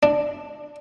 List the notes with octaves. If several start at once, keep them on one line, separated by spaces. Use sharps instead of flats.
D4